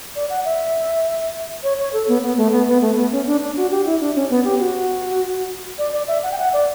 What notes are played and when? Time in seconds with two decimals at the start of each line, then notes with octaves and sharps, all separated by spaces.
0.16 D5
0.30 F#5
0.45 E5
1.63 C#5
1.79 C#5
1.93 A4
2.08 B3
2.22 B3
2.37 A3
2.52 B3
2.68 B3
2.81 A3
2.96 B3
3.12 C#4
3.26 D4
3.41 D4
3.56 F#4
3.71 G4
3.86 E4
4.01 D4
4.15 C#4
4.30 B3
4.44 G4
4.59 F#4
5.78 D5
5.93 D5
6.08 E5
6.23 F#5
6.32 G5
6.38 F#5
6.53 D5